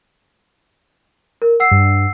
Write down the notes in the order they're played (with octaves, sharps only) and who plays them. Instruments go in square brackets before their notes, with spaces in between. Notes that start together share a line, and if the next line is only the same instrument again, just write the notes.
[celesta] A#4
F#5 E6 C7
[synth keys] G2